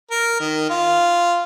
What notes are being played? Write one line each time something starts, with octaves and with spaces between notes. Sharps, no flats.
A#4
D#3
F4